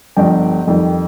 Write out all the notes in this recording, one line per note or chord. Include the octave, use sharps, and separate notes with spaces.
G1 G2 F3 D#5 G5
F2 D#3 G3